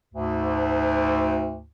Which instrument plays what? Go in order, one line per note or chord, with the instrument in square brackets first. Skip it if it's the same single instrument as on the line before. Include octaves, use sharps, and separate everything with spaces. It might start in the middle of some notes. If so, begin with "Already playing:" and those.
[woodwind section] D2 G#2